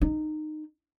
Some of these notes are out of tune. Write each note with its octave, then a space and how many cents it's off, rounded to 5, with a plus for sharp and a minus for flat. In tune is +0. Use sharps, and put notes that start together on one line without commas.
D#4 -20